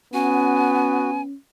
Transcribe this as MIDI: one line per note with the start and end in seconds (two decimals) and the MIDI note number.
0.14 1.26 59
0.14 1.35 61
0.14 1.10 66
0.14 1.21 80